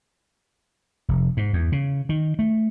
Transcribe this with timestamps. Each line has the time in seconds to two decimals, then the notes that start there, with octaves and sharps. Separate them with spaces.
1.08 F1
1.37 G#2
1.53 E2
1.72 C#3
2.09 D#3
2.39 A3